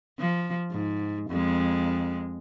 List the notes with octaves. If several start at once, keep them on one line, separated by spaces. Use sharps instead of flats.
F3
G#2
F2 G#3